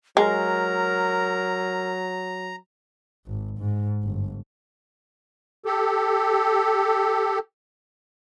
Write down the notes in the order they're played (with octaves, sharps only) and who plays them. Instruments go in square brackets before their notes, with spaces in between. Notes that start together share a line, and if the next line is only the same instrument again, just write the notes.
[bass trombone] F#3 [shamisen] G#3 [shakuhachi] A#4 [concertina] A#5
[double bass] G#1
G#2
G1
[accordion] G4 A4